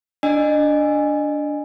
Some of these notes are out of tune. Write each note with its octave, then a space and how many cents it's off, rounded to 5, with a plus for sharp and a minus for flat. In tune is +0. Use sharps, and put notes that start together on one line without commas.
D4 -10 D#5 -30 G#5 -10